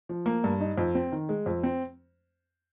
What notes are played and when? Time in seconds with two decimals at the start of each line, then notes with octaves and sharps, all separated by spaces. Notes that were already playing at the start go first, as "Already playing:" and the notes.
0.09 F3
0.26 A#3
0.44 G2
0.61 D#4
0.78 F2
0.95 C4
1.12 D#3
1.29 G#3
1.46 F2
1.63 C4